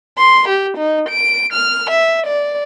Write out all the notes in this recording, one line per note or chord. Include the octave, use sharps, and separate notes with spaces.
C6
G4
D#4
D7
F6
E5
D5